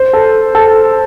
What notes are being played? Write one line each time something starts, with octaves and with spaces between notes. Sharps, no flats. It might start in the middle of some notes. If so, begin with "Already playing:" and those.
Already playing: C5
A4
A4